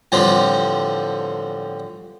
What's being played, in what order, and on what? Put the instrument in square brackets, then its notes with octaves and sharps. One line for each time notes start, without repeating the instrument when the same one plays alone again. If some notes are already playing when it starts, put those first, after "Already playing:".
[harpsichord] E2 A2 D3 F3 G3 C4